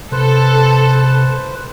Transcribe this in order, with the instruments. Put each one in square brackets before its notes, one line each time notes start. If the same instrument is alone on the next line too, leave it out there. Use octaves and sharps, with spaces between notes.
[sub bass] C3 [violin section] A4 [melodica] B4 C5